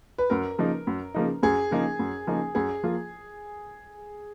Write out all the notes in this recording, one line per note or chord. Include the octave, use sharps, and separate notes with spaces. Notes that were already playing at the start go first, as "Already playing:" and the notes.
B4
F#2 A#4
C#3 F3 A#3 D#4
F#2
C#3 F3 A#3 D#4
F#2 G#4
C#3 F3 A#3 D#4
F#2
C#3 F3 A#3 D#4
F#2 G#4
F3 A#3 F4